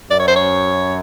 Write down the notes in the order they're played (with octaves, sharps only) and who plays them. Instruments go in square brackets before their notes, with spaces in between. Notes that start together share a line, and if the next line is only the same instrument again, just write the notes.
[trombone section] F#2 [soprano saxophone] D5
[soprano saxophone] C#5
C5
C#5